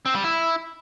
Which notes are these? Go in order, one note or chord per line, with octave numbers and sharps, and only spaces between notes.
C4
G3
E4